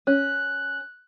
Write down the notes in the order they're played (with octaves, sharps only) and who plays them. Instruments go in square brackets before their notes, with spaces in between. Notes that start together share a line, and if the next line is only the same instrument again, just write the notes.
[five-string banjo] C#4 [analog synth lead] F#6